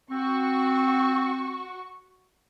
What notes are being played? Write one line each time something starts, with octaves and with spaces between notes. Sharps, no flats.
C4 F#4 C#6